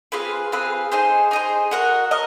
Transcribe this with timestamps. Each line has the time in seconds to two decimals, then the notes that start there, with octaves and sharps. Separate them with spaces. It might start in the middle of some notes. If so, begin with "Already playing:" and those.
0.12 C4 F4 G#4 B4
0.52 C4 F4 G#4 B4
0.92 D#4 G#4 C5
1.31 D#4 G#4 C5
1.71 F#4 A#4 D#5 F#5
2.11 A#4 D#5